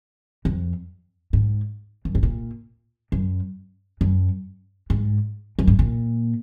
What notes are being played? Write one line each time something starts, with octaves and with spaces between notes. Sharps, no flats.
F2
G#2
F#2
G#2
A#2
F#2
F#2
G#2
F#2
G#2
A#2